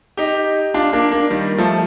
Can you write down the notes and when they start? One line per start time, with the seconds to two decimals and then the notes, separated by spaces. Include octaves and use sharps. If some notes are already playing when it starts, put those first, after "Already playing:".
0.17 D#4 G4
0.74 D4 F4
0.93 A#3 D4
1.12 A#3 D4
1.30 D#3 G3
1.58 F3 A3